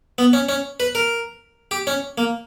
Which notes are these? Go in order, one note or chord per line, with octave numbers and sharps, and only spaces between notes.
B3
C#4
C#4
B4
A#4
G4
C#4
A#3